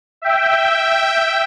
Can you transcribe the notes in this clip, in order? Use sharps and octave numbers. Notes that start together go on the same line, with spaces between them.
E5 G5